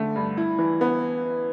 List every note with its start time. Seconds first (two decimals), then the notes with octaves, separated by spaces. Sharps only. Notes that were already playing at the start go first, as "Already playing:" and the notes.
Already playing: D3 A3
0.16 G2
0.37 E4
0.59 E3
0.81 B3